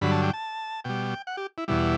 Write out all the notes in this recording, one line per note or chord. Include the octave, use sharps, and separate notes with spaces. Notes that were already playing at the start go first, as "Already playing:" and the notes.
G2 D3 F#3 B5
A5
G5
A5
B2 G3 G5
F#5
G4
E4
E2 B2 G3 E4